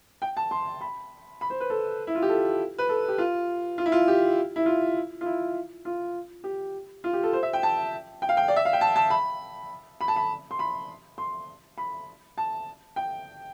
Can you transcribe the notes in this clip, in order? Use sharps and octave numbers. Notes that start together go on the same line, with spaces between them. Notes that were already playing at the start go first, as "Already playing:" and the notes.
G5
A5
C6
B5
B5
C5
B4
A4
E4
F4
G4
A4
B4
A4
G4
F4
F4
E4
F4
G4
E4
F4
F4
E4
F4
G4
F4
G4
A4
C5
E5
G5
A5
G5
F5
G5
D5
E5
F5
G5
A5
A5
B5
B5
A5
B5
C6
B5
C6
B5
A5
G5